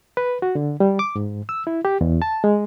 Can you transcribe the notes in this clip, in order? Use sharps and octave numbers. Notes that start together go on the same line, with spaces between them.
B4
F#4
D3
G3
D6
G#2
E6
E4
G4
E2
A5
G#3